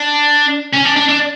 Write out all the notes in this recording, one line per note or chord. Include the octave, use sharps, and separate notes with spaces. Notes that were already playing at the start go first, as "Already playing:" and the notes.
Already playing: D4
C#4
D4
D4
D4